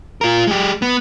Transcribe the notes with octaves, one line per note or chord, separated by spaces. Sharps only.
F4 A#4
G#3 G4
B3